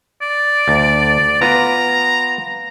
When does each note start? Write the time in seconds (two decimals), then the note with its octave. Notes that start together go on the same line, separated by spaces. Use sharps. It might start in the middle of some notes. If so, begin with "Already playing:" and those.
0.22 D5
0.68 D2
1.41 B3 F4 B4 A#5